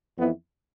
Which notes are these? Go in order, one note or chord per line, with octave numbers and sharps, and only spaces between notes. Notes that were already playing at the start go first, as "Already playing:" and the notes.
F2 E3 B3 E4